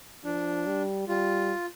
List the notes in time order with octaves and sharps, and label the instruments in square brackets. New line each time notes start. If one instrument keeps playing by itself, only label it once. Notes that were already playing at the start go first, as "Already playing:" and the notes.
[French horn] F3 [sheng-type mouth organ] D4
[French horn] G3
[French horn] G3 [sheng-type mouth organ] F4